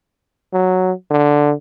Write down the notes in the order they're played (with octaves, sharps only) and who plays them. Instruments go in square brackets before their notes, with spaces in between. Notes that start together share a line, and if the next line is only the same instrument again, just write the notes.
[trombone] F#3
D3